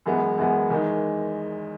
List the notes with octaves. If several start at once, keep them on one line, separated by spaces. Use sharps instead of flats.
F#2 E3 G#3 B3
F#2 E3 G#3 B3
E2 D#3 G#3 D#4